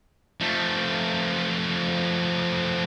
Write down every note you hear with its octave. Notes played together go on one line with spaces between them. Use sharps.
F3 A3